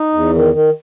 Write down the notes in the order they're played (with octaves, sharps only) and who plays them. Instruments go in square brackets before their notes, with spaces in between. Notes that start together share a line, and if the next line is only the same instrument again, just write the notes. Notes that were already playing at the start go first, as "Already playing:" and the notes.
Already playing: [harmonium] D#4
E2
D#3
D#3